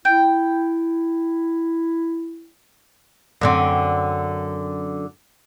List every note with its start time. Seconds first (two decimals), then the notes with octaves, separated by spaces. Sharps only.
0.05 E4 G5
3.41 F#2 D3 C4